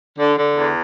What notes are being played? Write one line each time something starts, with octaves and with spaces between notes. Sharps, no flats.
D3
D3
E2